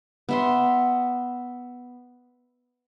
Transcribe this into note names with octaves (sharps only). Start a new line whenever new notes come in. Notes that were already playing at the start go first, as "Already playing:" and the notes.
B3 E5 C6